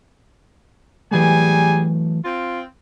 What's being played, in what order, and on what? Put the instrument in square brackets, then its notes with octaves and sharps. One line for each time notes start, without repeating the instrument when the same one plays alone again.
[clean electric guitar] E3 F#3 A3 [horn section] G3 G#4 G#5
[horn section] C4 F4